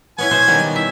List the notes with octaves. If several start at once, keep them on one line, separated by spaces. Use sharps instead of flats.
B3 C#4 E4 G#5
B2 C#4 C5
D#3 G3 B3
G3
E4 E5